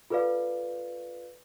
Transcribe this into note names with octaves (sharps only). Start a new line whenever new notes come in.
F4 A4 B4 D5 F5